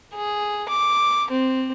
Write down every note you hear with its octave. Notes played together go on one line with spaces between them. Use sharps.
G#4
D6
C4